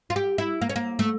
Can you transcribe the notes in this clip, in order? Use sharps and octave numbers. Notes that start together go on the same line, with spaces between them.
F4
G4
E4
A#3
C#4
A#3
A3